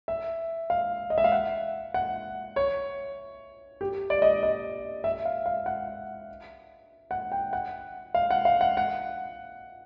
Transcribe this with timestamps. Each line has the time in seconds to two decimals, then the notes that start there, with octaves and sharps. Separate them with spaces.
0.08 E5
0.70 F5
1.10 D#5
1.18 E5
1.24 F5
1.32 F#5
1.94 F#5
2.56 C#5
3.81 G4
4.10 D5
4.22 D#5
4.43 D#5
5.04 E5
5.25 F5
5.46 F5
5.66 F#5
7.11 F#5
7.32 G5
7.53 F#5
8.15 F5
8.31 F#5
8.45 F5
8.61 F#5
8.77 F#5